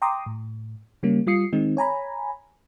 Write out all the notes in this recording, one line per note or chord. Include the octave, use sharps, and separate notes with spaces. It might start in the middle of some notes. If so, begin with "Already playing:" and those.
G5 A#5 C6 D6 D#6
A2
C#3 G3 A#3 C#4
G3 F4 D#6 C7 C#7
D#3 G#3 C4 D#4
C#5 G#5 A#5 B5